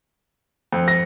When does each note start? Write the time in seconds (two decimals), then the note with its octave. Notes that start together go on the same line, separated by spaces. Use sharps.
0.73 F2
0.88 A#6